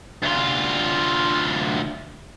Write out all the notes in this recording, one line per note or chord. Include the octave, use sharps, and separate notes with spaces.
D2 F4